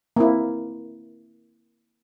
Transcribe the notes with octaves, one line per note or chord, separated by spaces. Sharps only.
A#3 C4 E4